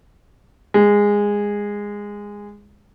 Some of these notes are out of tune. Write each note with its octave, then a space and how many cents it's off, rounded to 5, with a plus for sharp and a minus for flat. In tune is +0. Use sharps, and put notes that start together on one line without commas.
G#3 -15